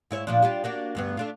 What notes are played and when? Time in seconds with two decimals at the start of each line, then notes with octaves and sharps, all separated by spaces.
0.11 G#2 E4 C#5
0.27 A#2 F3 D4
0.42 G3 D4 F4
0.64 A#3 D4 F#4
0.95 D2 G2 B3
1.17 A3 D4 F4